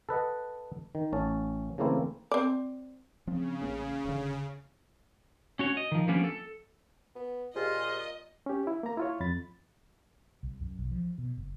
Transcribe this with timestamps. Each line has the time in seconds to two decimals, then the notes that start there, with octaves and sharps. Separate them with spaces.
0.09 A4 B4 D#5 F#5
0.95 D#3
1.13 A1 C#4 A5
1.78 C#3 E3 A3 A#3 C4 E4
2.31 C4 D5
3.27 C#3 F3 C4
3.62 A1 A#3 C#4
4.05 D#1 D3
5.59 C#4 F#4 C#5
5.77 D#5
5.92 D#3 F3
6.08 F3 G3 A#3 B3 C#4 D4
6.24 A4
7.15 B3
7.56 A#2 F4 G4 G#4 C5 D#5
8.46 C#4 G4
8.67 E4
8.83 A#3 A#5
8.97 E4 F4 C#5
9.20 F2 B5 A6
10.43 C2
10.61 F#2
10.79 B1
10.91 F3
11.18 B2
11.37 F#1